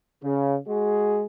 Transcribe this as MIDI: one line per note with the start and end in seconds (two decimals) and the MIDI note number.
0.23 0.56 49
0.68 1.25 56
0.68 1.25 66
0.68 1.25 68